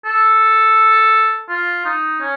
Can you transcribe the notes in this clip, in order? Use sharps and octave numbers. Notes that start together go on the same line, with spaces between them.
A4
F4
D#4
C#4